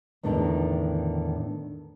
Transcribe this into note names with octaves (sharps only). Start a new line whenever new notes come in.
E2 A2 D3 D#3 D#4